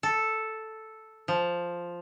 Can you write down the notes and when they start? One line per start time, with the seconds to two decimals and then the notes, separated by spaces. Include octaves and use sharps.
0.03 A4
1.28 F3